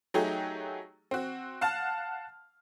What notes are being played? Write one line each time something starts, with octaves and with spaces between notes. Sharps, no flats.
F#3 A3 D#4 G4 G#4
C4 F#4
F5 F#5 A5 F6